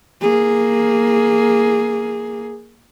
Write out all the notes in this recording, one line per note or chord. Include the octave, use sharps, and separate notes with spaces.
A#3 G#4